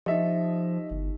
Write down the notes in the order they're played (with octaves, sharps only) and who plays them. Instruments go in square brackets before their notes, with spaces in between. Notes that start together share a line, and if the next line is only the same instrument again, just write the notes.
[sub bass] F3 [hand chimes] D#4 G4 [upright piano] D#5 E5
[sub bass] G1